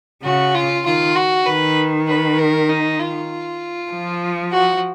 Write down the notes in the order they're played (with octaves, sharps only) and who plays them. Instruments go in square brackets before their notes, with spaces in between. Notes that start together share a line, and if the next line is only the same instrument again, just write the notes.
[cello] C#3 [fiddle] F#4
[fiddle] F4
[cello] D#3 [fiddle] F4
[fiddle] F#4
[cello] D#3 [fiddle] B4
[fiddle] B4
A#4
D#4
F4
[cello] F3
[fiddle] F#4